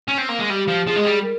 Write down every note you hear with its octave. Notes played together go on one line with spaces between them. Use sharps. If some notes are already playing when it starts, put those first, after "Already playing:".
C#4
C4
A#3
G#3
G3 G4
F3
F3 G#4
G#3
G3
A#4